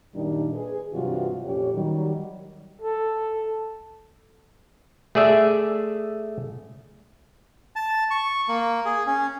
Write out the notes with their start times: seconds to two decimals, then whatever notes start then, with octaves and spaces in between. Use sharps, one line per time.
0.14 F#2 A#2 D#3 G3 D4 D#4
0.54 G#4 B4
0.93 G2 C3 E3 F#3 F4 F#4
1.44 F2 A#2 C#4 G4 C#5
1.73 D#3 F#3 G3
2.82 A4
5.15 A3 G#4 D5 E5
7.76 A5
8.11 C#6
8.48 A#3
8.85 G#4
9.07 C#4